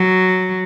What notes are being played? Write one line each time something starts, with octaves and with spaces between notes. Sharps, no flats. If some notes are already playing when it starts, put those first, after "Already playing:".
Already playing: F#3